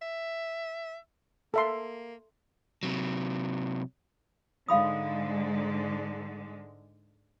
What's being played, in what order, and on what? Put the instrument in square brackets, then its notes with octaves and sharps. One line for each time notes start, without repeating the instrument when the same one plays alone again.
[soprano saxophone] E5
[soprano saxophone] A#3 [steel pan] A4 E5 C6
[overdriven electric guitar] C3 F#3
[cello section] G#2 D3 G#3 [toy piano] F5 B5 D#6